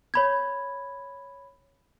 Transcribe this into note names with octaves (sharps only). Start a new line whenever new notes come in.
C#5 B5 G#6